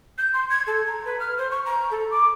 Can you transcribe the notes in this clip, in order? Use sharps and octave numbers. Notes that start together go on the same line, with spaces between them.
G6
C6
G#6
A4
A#5
B4
F6
C5
C#6
A#5
A4
D6